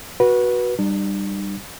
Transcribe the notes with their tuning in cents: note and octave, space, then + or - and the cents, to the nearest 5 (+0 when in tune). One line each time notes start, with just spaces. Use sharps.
F#4 +0 B4 -20
G3 +0 D4 +45